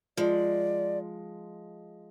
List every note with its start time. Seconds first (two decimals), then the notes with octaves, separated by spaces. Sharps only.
0.17 F3 G#3 D5